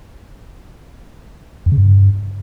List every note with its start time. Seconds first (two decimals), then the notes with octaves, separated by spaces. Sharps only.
1.66 F2
1.72 C#3
1.78 G2